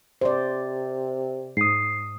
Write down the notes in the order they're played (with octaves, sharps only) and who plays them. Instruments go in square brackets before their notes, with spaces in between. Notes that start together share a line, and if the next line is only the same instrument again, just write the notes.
[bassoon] C3 [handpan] C5 D5
[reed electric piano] G#2 D#6 [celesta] C7